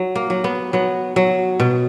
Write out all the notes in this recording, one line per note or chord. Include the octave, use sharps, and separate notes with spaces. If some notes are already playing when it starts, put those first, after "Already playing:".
Already playing: F#3
A#3
F#3
B3
F#3 B3
F#3
B2